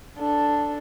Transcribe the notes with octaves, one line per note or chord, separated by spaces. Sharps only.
D4 A4